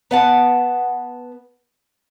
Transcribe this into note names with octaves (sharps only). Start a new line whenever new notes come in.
B3 F#5 A5